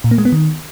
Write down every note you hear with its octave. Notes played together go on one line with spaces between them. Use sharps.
A#2
A#3
G#3
B3
D#3